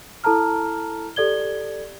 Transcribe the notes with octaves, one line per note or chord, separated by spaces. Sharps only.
E4 A4 A5 A#5 F6
G4 A4 D5 G#6 G7